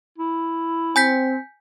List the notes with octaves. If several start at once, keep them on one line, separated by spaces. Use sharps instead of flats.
E4
C4 G#5 G6 B6